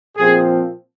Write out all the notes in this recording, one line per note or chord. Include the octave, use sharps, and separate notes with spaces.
A#2 F3 C4 G#4